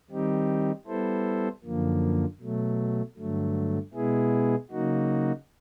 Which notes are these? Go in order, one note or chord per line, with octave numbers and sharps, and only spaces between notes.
D#3 G3 C4 D#4 G4
G3 B3 E4 A4 C5
F#2 D3 F3 A#3
B2 F#3 A3
G2 D3 F#3 A3
B2 G#3 B3 E4 G#4
C#3 F#3 A#3 D#4 F#4